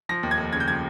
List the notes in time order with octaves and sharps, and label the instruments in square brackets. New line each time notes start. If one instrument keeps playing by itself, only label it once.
[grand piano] F3 A#6
D#2
G#6
F1
C#3 G#6
G6
F3 G#6